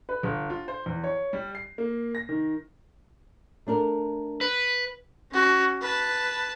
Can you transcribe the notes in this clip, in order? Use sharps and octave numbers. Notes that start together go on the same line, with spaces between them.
B4
G1
F4
C5
E2
C#5
G3
C7
A#3
A#6
D#3
A3 D4 A#4
B4
C#4 F#4
B4 A5